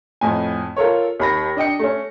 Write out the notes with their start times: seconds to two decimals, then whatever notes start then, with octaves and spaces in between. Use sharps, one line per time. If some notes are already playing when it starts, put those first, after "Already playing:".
0.21 F2 A2 G#5
0.76 F4 A4 A#4 C#5
1.20 D#2 B5 A#6
1.57 D4 D#5 G5 C#7
1.79 A3 C#4